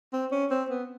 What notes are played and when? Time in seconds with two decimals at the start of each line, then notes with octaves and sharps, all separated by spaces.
0.13 C4
0.32 C#4
0.51 C4
0.70 B3